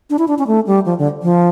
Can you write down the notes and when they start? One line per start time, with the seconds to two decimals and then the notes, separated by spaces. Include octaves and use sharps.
0.10 D4
0.18 E4
0.28 D4
0.38 C#4
0.47 A3
0.66 G3
0.85 F3
0.98 D3
1.22 F3